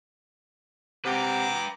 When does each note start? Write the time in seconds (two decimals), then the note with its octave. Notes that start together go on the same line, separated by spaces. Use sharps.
1.05 C3 B4 F#5 G5 A#5 D6